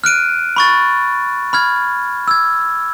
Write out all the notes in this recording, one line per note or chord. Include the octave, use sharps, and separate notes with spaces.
F6 F#6 D7 D#7
B5 C#6 A6
B5 F6 G#6
E6 G#6